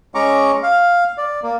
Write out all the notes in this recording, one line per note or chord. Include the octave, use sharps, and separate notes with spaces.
G#3 C#4 A#5 C#6 D6
F5
D5
A#3